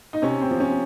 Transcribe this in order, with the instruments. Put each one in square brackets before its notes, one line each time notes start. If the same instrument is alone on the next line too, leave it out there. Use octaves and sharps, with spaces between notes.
[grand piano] D#4
C3 C#4
C4
F3
C#4